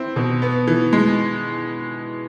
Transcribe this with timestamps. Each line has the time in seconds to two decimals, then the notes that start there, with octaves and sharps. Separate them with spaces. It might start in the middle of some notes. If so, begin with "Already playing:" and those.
Already playing: C4 E4
0.16 B2
0.42 B3
0.67 E3
0.93 G#3